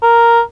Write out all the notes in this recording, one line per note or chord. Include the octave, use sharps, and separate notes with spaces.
A#4